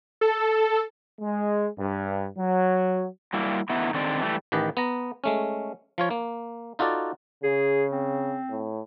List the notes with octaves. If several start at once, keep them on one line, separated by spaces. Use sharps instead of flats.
A4
G#3
G2
F#3
F#3 G3 A#3 E4
A3 B3 D#4 E4
D3 D#3 C4 D5
E3 G3 A3
A1 D#3 G4 B4 D#5
B3 A#5
G#3 A3 C#4
F3 F4 C#5
A#3
D#4 F4 F#4 A4 D5
C#3 G#4
C4
A2